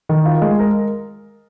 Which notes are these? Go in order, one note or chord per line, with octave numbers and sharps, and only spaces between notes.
D#3
F4
G#3
A#4